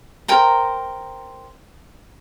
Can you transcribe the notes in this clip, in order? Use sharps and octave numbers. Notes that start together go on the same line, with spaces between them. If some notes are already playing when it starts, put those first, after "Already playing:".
A#4 C5 G5 A#5